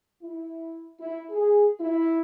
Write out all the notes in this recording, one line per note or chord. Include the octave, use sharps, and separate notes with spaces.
E4
E4
G#4
E4